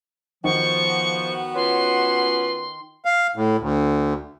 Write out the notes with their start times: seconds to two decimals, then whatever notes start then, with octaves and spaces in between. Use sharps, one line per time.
0.44 D#3 F3 B3 F#4 C#6
1.55 C#4 F4 B4 C6
3.05 F5
3.36 A2
3.59 D2